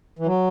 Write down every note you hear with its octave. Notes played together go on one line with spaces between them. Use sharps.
E3
F#3